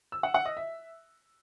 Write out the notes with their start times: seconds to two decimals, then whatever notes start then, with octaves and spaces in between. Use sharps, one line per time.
0.12 E6
0.23 F#5
0.34 F#5
0.46 D#5
0.57 E5